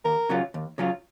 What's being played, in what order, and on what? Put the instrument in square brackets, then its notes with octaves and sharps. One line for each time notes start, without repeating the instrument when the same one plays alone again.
[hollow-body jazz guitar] D#2 [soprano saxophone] A#4
[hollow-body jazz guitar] C#3 F#3 C#4 F4
D#2
C#3 F#3 C#4 F4